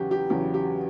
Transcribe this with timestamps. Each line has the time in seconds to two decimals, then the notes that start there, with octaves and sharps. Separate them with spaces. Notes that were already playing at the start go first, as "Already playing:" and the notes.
Already playing: E2 C#3 F#3 F#4 G4
0.11 G4
0.30 E2 C#3 F#3 G4
0.54 G4